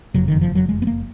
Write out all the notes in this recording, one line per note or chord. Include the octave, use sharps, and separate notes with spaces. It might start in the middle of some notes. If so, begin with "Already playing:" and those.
F#1 F2 C#3 F#3
D#3
F3
F#3
G#3
B3
A#3